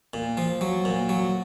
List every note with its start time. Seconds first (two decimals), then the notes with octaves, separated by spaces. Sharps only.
0.14 A#2
0.37 F3
0.61 F#3
0.85 A#2
1.09 F#3